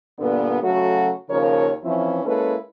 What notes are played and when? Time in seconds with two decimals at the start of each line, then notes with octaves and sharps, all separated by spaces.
0.19 G2 A#2 D3 B3
0.62 C#3 F#3 A3 C#4 F#4 A4
1.30 D#2 C#3 F3 A#4 C#5
1.84 E3 F3 C4 C#4 E4
2.25 G#3 A#3 C#4 E4 A4 B4